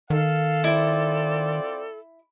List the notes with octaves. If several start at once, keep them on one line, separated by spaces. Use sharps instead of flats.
D#3 A4 F5
C4 E4 F4 D5